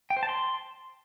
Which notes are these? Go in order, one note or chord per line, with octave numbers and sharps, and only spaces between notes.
G5
C5
A5
C6